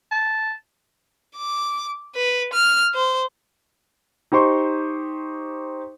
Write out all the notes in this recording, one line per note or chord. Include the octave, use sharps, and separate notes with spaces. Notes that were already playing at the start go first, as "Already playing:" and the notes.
A5
D6
B4
F6
C5
D#4 G4 C5 C6 C#6